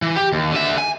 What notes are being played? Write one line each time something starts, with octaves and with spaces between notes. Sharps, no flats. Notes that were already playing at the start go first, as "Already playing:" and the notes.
E3
G4
D#2
D3 E5
G#5